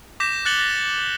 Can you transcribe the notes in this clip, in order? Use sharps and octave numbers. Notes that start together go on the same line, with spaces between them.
D6 G6 A#6 B6 E7
F#6 A6 C#7 F#7 G7
F#6 A6 A#6